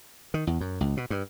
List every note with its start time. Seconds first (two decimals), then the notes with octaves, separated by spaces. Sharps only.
0.34 D#3
0.47 E2
0.61 F#2
0.81 C#2
0.97 B2
1.10 G2